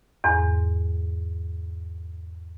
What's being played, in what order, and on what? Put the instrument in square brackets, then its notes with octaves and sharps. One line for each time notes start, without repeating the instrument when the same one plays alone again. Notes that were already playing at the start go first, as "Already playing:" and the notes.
[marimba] E2 G#2